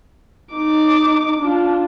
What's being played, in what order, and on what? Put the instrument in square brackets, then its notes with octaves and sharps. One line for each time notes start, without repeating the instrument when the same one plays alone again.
[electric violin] D#4 D6
D4 F4